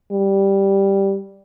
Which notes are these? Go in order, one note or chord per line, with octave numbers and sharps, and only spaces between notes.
G3